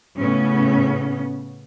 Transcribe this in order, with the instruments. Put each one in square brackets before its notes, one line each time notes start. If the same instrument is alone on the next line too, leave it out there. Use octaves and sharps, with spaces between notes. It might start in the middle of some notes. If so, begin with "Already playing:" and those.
[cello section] A2 C#3 B3 C#4